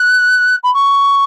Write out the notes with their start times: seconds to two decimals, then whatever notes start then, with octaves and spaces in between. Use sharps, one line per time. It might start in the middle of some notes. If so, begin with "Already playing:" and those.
Already playing: F#6
0.63 B5
0.74 C#6